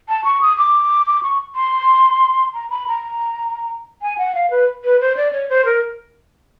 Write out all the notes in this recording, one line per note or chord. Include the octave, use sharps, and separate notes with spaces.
A5
C#6
D#6
D6
D6
C#6
C6
A#5
B5
A#5
G#5
F#5
F5
B4
B4
C5
D5
C#5
C5
A#4